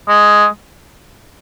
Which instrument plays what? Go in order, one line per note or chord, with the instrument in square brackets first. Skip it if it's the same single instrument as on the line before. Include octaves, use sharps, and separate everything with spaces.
[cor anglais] G#3